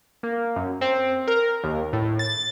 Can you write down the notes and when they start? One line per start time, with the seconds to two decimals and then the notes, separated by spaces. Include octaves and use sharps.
0.23 A#3
0.56 F#2
0.81 C4
1.28 A#4
1.64 D#2
1.93 A2
2.19 A6